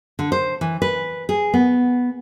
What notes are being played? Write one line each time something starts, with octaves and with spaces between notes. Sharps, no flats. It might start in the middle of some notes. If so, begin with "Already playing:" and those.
D3
C5
E3
B4
G#4
B3